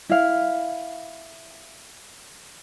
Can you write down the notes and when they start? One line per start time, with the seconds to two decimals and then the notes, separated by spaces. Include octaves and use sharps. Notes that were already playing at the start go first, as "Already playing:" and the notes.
0.10 E4 F5